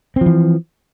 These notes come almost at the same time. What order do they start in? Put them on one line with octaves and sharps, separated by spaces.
C4 F3 E3